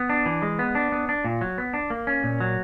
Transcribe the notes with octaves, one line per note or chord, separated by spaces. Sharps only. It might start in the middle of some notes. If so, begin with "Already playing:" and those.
Already playing: B3
D4
E3
G#3
B3
D4
B3
D4
A#2
F#3
B3
D4
A#3
C#4
A#2
F#3